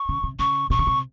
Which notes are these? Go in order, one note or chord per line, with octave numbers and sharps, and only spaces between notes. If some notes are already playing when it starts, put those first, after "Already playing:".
Already playing: C#6
C#3
C3
C#3 C#6
C3 C#6
C#3
C3